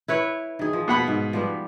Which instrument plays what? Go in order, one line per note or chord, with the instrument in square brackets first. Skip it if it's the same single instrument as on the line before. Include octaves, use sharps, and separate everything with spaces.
[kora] E4 B4 C#5
D#3 G#4
F3
[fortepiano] B2 F#5 B5
[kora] G#2
F3 G3 B3